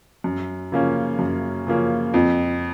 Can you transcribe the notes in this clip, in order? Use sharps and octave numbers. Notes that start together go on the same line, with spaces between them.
F#2
C#3 F3 A#3 C#4
F#2
C#3 F3 A#3 C#4
F2